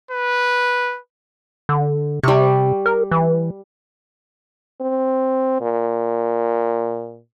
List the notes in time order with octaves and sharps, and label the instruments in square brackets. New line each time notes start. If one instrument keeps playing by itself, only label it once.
[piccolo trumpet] B4
[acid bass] D3
[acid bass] C3 [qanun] G3 C#6
[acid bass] A#4
E3
[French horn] C4
A#2